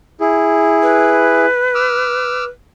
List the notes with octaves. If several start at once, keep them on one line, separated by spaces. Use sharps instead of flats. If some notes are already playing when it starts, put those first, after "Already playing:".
E4 G#4
B4
D6 E6 F6